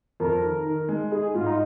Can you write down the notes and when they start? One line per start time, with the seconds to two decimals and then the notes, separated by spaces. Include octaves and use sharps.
0.20 F2 A#4
0.43 D#3
0.65 D#3
0.88 G#3
1.11 D#4 G#4
1.34 G#2 F4
1.46 D#4